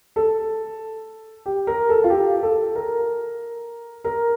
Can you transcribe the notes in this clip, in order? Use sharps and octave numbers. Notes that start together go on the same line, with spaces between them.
A4
G4
A#4
A4
F4
G4
A4
A#4
A#4